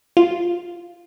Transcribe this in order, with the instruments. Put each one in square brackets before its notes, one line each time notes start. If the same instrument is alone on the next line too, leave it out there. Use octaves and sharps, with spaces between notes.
[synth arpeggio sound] F4